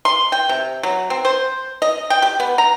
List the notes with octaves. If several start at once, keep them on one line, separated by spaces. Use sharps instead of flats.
C6
G5
C3
F#3
C4
C5
D#5
G5
G4
B3
A#5